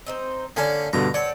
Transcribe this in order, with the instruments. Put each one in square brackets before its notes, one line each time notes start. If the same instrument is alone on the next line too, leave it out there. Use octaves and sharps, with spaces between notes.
[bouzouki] C4 D#4 C5
[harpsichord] D3 C#4 G#5 [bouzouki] A#3 A4 D5
[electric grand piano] G2 B2 D3 [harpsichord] A#5
[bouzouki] C4 F#4 A4 [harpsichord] C#5 [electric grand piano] D5